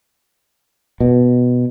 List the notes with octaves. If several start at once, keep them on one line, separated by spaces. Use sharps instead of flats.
B2